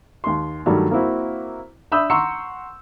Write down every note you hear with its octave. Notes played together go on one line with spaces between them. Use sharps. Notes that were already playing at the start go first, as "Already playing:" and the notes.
D#2 C6
G2 D#3 F#3 G3 A3
A#3 C4 E4 F#4
D4 E5 B5 D#6 E6 G6
F#5 A#5 C6 C#6 E6 C#7